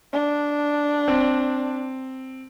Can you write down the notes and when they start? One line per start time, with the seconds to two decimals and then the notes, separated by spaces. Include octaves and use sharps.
0.13 D4
1.08 C4